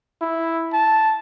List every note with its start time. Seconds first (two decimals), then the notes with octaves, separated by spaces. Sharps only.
0.22 E4
0.73 A5